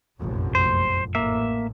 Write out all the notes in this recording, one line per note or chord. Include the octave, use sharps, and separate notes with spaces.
F1 A#1 F#2
C5
A1 A2 A#3 E5